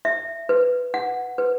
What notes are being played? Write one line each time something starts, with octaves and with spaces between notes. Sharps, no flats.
E5
B4
F#5
B4